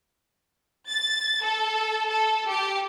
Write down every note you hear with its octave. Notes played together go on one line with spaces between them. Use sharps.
A6
A4
A4
G4